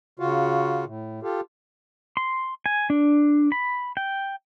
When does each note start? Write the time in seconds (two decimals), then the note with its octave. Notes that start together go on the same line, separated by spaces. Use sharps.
0.19 C#3 F4 F#4
0.86 A2
1.23 F4 G4 A4
2.17 C6
2.66 G#5
2.90 D4
3.52 B5
3.97 G5